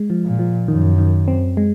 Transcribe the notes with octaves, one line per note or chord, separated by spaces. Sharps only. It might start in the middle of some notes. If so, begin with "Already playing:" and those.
Already playing: G#3
F3
A#2
F3
F#2 D#3
D#3
C4
G#3